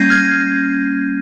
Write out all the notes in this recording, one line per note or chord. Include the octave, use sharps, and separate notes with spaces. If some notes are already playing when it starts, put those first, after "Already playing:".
Already playing: G3 A#3 C#4 G6 G#6 A#6 C7 D#7
F6 G#6